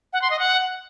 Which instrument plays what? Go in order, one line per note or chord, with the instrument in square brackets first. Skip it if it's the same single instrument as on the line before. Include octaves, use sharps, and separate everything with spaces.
[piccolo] F#5
C6
D#5
F#5